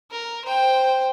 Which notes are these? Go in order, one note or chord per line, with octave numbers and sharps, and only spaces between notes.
A#4
C5 G5